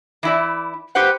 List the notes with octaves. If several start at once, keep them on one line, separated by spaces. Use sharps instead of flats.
E3 E4 D5
G4 B4 C5 F#5